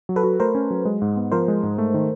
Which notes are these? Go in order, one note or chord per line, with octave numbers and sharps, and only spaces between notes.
F#3
A4 B4
F#4
A3 A#4 C5
C#4
F#3
G#3
G#2
B3
F3 A#4 C5
G#3
G#2
A3
D#3